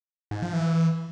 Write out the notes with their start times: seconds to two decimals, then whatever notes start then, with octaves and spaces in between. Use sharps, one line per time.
0.31 G#2
0.42 F3
0.53 E3